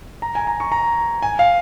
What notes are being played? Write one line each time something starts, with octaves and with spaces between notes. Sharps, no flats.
A#5
G#5
A#5
C#6
A#5
G#5
F5